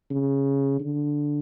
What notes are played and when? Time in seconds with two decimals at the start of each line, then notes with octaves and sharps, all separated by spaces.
0.11 C#3
0.80 D3